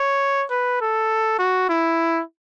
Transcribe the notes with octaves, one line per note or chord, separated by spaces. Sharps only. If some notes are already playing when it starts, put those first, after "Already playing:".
Already playing: C#5
B4
A4
F#4
E4